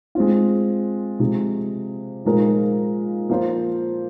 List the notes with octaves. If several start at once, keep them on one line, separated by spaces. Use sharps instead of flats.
G#3 C4 F4
C3 F3 G#3
A#2 F3 G#3 D#4 A#4
F3 A#3 F4 C5